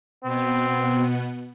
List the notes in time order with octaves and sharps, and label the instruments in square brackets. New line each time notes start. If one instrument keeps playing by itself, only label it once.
[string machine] B2 B3 [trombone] C4